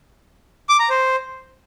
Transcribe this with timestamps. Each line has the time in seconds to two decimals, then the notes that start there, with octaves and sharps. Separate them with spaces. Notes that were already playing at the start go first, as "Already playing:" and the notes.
0.69 D6
0.79 A#5
0.90 C5